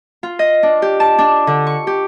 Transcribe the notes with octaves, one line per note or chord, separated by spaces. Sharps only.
F4
D#5
D4
G4
A5
D4
D3
C#6
G4